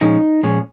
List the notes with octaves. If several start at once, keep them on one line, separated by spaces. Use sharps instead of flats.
A#2 F3 G#3 C#4 D#4
A#2 F3 G#3 C#4